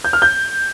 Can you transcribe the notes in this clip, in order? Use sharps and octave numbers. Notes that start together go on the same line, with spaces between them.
G6
F6
G6